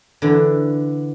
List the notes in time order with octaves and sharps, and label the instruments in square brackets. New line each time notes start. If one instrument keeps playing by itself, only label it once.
[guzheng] D3 E3